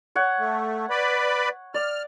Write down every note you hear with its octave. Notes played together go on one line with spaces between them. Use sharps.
C#5 F#5
A3
B4 D5 B5
D5 F6